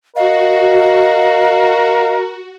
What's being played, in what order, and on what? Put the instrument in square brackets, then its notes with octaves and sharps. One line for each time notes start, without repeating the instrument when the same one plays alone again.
[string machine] F#4 [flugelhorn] A#4 [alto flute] D#5 [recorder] F5